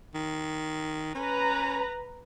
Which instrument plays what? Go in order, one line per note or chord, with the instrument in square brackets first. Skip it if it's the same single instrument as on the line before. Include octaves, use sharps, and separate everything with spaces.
[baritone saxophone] D#3
[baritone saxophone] C#4 [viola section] B4 A#5